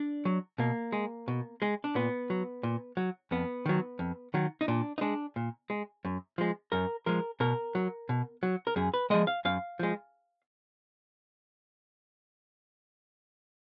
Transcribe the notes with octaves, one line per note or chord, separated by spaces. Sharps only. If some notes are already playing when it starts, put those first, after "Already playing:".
Already playing: D4
F#3
B2 A#3
G#3
B2
G#3
D4
A#2 B3
F#3
A#2
F#3
F2 B3
D#3 F#3
F2
D#3 F#3
D#4
A#2 D4
D#4
G#3 D4
A#2
G#3
F#2
F3 G#3
F#2 A#4
F3 G#3 A#4
B2 A#4
F#3
B2
F#3
A#4
F#2 G#4
B4
F3 G#3 D#5
F5
F#2 F5
F3 G#3